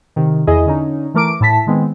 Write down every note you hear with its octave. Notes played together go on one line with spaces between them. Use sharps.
C3 D#3
E2 E4 G#4 D#5
D3 C#4 D#4
E3 A3 A#4 D6 D7
A2 E4 A5 B6
D#3 G#3 B3 C4